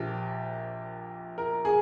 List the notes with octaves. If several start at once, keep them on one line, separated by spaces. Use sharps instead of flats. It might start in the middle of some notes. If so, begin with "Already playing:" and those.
Already playing: A#1 A#2 F3 G4
A#4
G#4